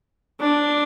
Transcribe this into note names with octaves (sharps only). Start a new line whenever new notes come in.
D4